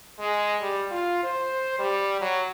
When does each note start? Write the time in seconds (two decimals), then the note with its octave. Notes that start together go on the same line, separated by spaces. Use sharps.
0.19 G#3
0.61 G3
0.91 F4
1.23 C5
1.79 G3
2.21 F#3